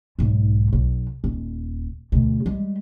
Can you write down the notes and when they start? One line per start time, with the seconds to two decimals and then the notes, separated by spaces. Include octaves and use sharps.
0.19 B1 G#2
0.73 B1
1.24 D#1
2.12 D2 B2
2.46 G3 G#3